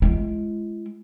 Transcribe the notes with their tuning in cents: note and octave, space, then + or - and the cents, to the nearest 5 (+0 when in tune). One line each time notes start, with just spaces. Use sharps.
G#3 +20 E4 +40